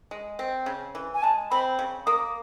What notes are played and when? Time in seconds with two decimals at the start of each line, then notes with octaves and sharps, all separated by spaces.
0.11 G#3
0.39 C4
0.66 C#3
0.95 E3
1.14 G#5
1.23 G#3 A5
1.51 C4 B5
1.79 C#3
2.06 A#3 D#6